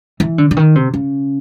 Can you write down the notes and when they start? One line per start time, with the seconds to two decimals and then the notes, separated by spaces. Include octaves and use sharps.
0.20 E3
0.38 D3
0.51 D3
0.57 D#3
0.75 C3
0.94 C#3